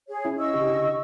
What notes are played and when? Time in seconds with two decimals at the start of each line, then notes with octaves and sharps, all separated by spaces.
0.08 G#4 C#5
0.25 C#4 E4
0.38 D#5 C#6 E6
0.53 C#3 D4 G4